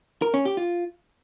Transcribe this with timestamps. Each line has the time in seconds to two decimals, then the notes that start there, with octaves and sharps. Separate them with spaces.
0.22 A#4
0.34 C#4
0.45 G4
0.57 F4